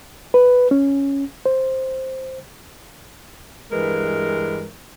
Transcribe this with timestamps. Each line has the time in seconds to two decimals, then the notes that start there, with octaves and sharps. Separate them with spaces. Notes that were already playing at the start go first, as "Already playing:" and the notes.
0.34 B4
0.71 C#4
1.46 C5
3.72 G2 E3 G#3 A#4 B4